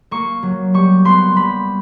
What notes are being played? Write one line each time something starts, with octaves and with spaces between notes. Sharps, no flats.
A#3 C#6
F#3
G3 C#6
B3 C6
G3 B5